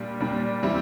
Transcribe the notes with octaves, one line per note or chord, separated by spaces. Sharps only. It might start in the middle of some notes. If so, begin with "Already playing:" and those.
Already playing: A#2 G3 D4
A#2 G3 D4
E3 G3 C4 E4